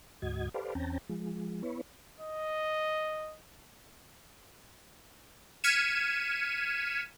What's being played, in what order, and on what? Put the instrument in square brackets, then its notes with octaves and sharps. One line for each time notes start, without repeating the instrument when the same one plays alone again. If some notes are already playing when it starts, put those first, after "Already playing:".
[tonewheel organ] D2 G#2 F#4 D#5 G#6
G4 A4 B4 C5 D5 F5
E2 C4 C#4 G5 A5 A#5
F3 G#3
B3 E4 B4 C#5
[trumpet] D#5
[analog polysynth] F6 G#6 B6 C#7 D#7 E7